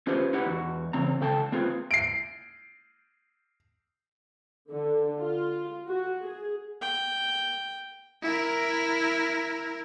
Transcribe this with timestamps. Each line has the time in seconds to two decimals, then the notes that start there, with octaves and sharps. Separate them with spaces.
0.07 C#4 F4 G4 G#4 B4 C5
0.33 D#4 E4 G4 B4 F#5
0.46 E2 F#4
0.93 C#3 E3 C4 A#5
1.21 C#3 A4 G5 A5
1.52 A#3 C4 F4 G#4 B4
1.91 C7 D7
4.69 D3
5.21 F4
5.88 F#4
6.22 G#4
6.82 G5
8.23 E4 A#4